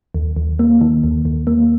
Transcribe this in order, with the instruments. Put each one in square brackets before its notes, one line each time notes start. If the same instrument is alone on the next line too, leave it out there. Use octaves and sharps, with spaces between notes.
[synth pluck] D#2
D#2
A#3
D#3
D#2
D#2
A#3